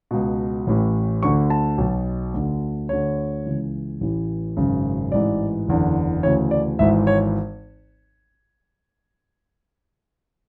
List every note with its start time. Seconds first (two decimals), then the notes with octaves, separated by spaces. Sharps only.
0.11 C#2 B2
0.67 A1 A2 E3
1.23 D2 D3 C#6
1.50 A5
1.78 B1 B2
2.34 D2 D3
2.89 D2 D3 C#5
3.46 C#2 C#3 E3
4.01 A1 A2 E3
4.57 G#1 F#2 C#3
5.12 A1 G#2 E3 D5
5.68 F#1 E2 D3
6.23 D2 C#3 E3 C#5
6.51 D5
6.79 G#1 G#2 E3 E5
7.07 C#5